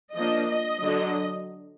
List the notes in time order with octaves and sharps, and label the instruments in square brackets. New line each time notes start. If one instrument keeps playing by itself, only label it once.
[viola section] F3 A#3 D4 D#5
D#5
D3 F#3 D4